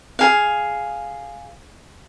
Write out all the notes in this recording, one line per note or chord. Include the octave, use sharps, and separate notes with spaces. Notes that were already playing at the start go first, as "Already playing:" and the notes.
G#4 F5